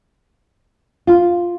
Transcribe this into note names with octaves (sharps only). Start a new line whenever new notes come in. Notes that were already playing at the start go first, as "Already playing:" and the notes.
F4